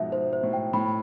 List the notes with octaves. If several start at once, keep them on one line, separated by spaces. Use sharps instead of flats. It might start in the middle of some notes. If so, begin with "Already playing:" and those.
Already playing: G#2 B2 F3 E5
G#2 C5
C5
A2
G5
A2 B5